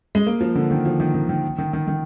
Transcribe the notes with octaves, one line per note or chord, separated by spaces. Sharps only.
G#3
A#3
F3
D3
D#3
F3
D#3
D#3
D#3
D#3
D#3
D#3